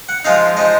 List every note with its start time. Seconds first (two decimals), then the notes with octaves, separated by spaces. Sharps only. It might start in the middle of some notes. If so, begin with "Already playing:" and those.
0.09 F#5
0.25 F3 G#3 D#4 F5
0.57 F3 G#3 D#4 D#5